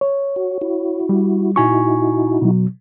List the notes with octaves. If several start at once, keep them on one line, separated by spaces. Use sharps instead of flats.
C#5
F#4
E4 F#4
G3
A#2 D#4 E4 F#4 G#5 C#6
B2 F#3